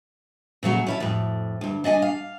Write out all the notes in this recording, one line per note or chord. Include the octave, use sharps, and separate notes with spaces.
A#2 C#3 F#3 A3
C#4 E4 A4
F2 A2
D2 G2
D4 D#5 F#5 G#5
F5